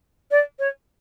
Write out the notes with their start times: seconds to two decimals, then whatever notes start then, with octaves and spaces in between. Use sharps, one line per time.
0.31 D5
0.59 C#5